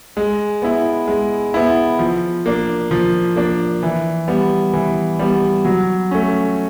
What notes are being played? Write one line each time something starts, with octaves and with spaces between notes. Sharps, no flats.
G#3
B3 E4
G#3
B3 E4
F3
A#3 D4
F3
A#3 D4
E3
G3 B3
E3
G3 B3
F#3
A3 C#4